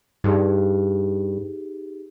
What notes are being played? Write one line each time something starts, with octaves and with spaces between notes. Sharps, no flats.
G2 D#4 G4 G#4